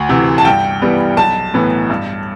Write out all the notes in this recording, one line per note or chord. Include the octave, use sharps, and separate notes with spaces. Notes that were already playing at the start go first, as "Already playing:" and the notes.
Already playing: D2
C3 E3
A5
G2 G5
E3 G3 B3
B1 A5
A2 E3 B3
G2